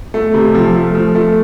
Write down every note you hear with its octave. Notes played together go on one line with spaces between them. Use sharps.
A3
C3
F3
A3
F3
A3